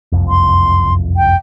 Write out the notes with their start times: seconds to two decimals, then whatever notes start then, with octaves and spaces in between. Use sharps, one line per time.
0.12 F#1 C2 F2
0.29 C6
1.17 G5